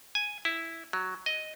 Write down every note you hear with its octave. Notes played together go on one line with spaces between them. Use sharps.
G#5
E4
F#3
D#5